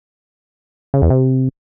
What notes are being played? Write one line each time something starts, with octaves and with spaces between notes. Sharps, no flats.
C#3
E2
C3